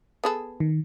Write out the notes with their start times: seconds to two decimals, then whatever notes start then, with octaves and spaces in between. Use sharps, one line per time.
0.24 B3 G#4 A4
0.60 D#3